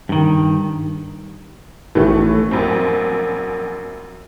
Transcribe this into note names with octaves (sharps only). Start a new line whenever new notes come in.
G2 D#3
A1 A2 E3 A3
A#1 F#2 C4